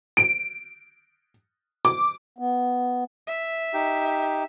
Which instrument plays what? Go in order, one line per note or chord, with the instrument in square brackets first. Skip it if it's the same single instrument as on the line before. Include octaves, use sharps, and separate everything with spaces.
[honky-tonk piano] D7
D6
[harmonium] B3
[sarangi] E5
[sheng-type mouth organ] D#4 G4